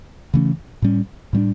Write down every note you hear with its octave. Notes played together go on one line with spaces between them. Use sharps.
C#3 E3 A3 C#4
A2 G3 C#4
A2 G3 A#3 D4